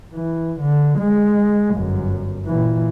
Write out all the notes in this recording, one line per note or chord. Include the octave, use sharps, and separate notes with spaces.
E3
D3
G#3
G1 F#2
A#2 E3